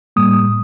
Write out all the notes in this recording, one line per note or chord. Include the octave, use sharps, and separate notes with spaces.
A2 G3 A#3 D#6